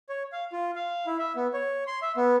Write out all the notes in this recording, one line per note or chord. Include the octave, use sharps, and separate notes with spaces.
C#5
F5
F4
F5
E4
E5
B3
C#5
C6
E5
B3